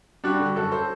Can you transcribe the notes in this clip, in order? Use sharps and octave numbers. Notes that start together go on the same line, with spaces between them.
G3 D4 F#4
D3
F#2 F#4 A4
A4 C5